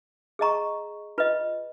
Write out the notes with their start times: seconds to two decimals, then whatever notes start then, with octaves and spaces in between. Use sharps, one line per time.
0.39 G#4 D#5 A#5 C#6
1.18 F4 B4 D#5